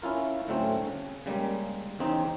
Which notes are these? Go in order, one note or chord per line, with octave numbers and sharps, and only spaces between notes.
C#4 E4 F4 A#4
A2 D3 F#3 A3 C4 C#4
C#3
C#3 G3 G#3 A#3
E2 C#3 C4 D#4